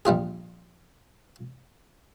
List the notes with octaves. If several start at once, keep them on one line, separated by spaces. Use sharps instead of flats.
A#1 G3 F4 G#4